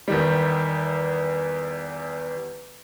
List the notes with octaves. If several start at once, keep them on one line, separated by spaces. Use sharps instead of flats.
E2 D#3 G3